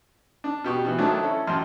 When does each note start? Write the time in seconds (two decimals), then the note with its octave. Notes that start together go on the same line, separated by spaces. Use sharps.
0.44 D4
0.64 B2 G4 C#6
0.85 B2 E3
0.98 D#3 F3 F#3 A3 D4
1.23 C#4 E4 A4
1.47 A1 F#2 A5 C6 F6